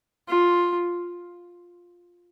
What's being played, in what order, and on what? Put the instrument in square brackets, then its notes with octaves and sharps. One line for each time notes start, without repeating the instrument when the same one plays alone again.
[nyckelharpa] F4